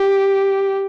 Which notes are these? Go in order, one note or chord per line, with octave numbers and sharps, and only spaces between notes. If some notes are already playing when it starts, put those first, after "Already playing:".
Already playing: G4